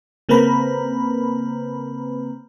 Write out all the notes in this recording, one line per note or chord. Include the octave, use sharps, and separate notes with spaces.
C#3 A#3 C4 B4 A#5 B5